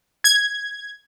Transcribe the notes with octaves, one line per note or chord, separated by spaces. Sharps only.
G#6